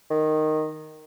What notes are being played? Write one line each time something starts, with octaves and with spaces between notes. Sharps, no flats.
D#3